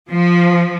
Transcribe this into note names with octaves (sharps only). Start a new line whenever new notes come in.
F3